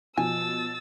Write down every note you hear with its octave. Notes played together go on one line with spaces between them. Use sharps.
B2 F3 G#5 E6 A6